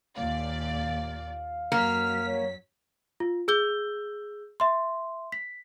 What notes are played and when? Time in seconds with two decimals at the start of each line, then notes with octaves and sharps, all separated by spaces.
0.15 D#2 A#2 D5 F5
1.72 F#2 F#3 A#3 F6 B6
2.26 C#5
3.20 F4
3.48 G#4 E6 G6 G7
4.60 E5 C6
5.32 B6